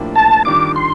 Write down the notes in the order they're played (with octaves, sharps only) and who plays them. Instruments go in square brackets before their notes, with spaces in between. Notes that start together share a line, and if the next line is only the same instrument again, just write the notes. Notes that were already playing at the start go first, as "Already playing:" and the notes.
Already playing: [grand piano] A2 F3 A#3 D4 G4
[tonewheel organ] A5
[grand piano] D#3 G3 D4 F4 [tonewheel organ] D6
[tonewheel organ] C6